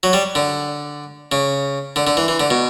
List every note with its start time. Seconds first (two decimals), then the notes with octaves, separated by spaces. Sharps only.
0.03 F#3
0.13 G3
0.35 D3
1.32 C#3
1.96 D3
2.07 D3
2.17 E3
2.28 E3
2.40 D3
2.50 B2